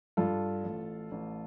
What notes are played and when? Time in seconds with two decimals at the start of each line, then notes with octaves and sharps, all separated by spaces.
0.17 G2 F4 A4
0.64 A1
1.11 A1